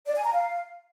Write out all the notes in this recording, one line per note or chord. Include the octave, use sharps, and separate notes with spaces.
D5
G#5
A#5
F5